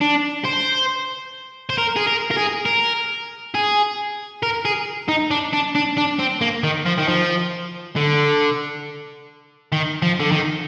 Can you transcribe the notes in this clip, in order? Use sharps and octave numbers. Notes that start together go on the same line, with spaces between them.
D4
C5
C5
A#4
G#4
A#4
A#4
G#4
A#4
G#4
A#4
G#4
D#4
D4
D4
D4
D4
C4
A#3
D#3
F3
D#3
F3
D3
D#3
F3
D3
D#3